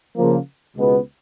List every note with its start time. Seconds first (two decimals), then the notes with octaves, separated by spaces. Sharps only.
0.17 C#3 F3 A#3
0.76 C#2 B2 G#3 B3